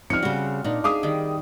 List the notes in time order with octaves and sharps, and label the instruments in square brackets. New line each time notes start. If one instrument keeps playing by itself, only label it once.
[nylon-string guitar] F3 C4 D#4 [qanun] G3 C#4 [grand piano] F6 C#7
[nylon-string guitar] C#3 G3 [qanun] C4 F#4
[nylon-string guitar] A#2 [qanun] D4 D#4
[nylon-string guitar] G#4 E5 F5 [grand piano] D6 D#6
[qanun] D#3 G3